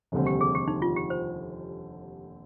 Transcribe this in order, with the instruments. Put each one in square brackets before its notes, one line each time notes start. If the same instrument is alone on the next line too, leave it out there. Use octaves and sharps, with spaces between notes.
[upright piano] F1 D#2 D3 G3 C4
[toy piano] G4
G#4
G4
D#4
F4
G4
C5